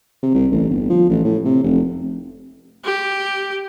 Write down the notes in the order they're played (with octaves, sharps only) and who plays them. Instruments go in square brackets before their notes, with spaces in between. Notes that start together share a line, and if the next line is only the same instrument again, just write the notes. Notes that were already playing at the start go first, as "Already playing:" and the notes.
[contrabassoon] C3
C2
A1
G1
F3
A1
A2
C3
F1
[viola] G4